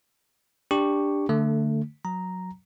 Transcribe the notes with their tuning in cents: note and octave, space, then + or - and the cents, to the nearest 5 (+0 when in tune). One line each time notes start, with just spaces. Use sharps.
D4 +0 G4 +10 C#6 +0
D3 +0 A3 +20
F#3 -10 A#5 +0